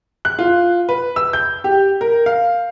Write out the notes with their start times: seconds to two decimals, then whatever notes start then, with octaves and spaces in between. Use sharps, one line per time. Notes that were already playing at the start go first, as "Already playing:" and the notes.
0.25 F#6
0.39 F4
0.89 B4
1.16 E6
1.33 G6
1.64 G4
2.01 A#4
2.26 F5